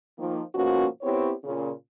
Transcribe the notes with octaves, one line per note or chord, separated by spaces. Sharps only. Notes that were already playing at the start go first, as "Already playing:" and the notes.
D#3 F3 A#3
G#2 B2 F3 A#3 C#4 F#4
B3 C4 E4 G4 C#5
A#2 C#3